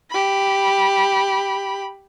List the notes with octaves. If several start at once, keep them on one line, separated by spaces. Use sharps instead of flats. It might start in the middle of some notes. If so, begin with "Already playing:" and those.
G4 B5